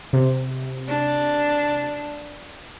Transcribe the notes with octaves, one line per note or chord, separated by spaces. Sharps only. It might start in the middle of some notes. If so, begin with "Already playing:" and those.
C3
D4